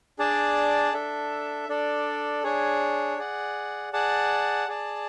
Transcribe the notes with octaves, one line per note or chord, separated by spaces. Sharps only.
D4 G#4 D5 A5
D4 A4 E5
D4 A4 D5
D4 G#4 C#5
G#4 D5 F#5
G#4 D5 F#5 A5
G#4 D5 A5